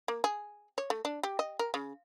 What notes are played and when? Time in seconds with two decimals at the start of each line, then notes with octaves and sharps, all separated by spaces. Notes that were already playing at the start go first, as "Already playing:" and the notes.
0.08 A#3
0.24 G#4
0.78 C#5
0.90 A3
1.05 D4
1.23 G4
1.39 D#5
1.59 A#4
1.74 C#3